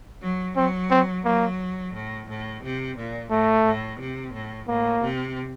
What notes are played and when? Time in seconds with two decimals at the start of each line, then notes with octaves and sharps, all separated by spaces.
0.22 F#3
0.56 F#3 C4
0.91 C4
1.25 F#3 A#3
1.94 A2
2.28 A2
2.63 C3
2.97 A#2
3.31 A2 A3
3.65 A2
3.99 C3
4.33 A2
4.68 A2 A#3
5.02 C3